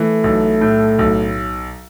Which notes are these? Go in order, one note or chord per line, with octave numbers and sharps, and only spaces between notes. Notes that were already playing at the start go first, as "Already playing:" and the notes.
Already playing: E3 A3
B1
A2
B1